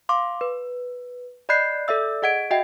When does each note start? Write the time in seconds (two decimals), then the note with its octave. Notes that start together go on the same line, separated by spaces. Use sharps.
0.09 F5 C6 D6
0.41 B4
1.49 D5 D#5 B5 F#6 G6 C7
1.88 A4 D5 E5 E6
2.22 G#4 D#5 F#5 G#6 D7
2.51 F#4 D#5 E5 G5